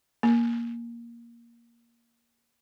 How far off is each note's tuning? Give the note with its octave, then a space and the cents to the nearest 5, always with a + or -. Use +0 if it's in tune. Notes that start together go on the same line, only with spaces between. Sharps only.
A#3 +10